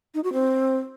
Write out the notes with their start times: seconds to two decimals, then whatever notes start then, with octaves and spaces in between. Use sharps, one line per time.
0.14 D#4
0.24 F#4
0.33 C4